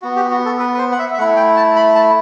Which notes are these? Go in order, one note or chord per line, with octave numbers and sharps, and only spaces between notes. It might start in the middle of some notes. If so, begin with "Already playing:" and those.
B3 F#4
G4
F#4
A4
B4
B4
C5
F#5
E5
E5
A3 E4 F#5
G5
A5
B5
A5